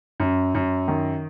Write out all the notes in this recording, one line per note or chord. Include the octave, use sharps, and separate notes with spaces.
F#2
F#2
D#3